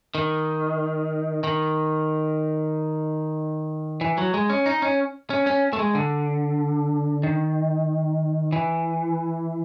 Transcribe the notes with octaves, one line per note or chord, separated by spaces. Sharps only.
D#3
D#3
E3
F#3
G#3
C#4
D#4
C#4
C#4
C#4
A3
G#3
D3
D#3
E3